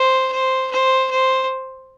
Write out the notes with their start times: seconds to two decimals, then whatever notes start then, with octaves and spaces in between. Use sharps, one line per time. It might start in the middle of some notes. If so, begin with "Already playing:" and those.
Already playing: C5
0.33 C5
0.71 C5
1.11 C5